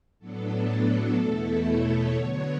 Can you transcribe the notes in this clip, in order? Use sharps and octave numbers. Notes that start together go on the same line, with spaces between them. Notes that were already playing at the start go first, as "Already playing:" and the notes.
A2 F#3 B3 D4 A4
A4
E2 B2 A3 E4
C#5
D3 F#3 B3 C#5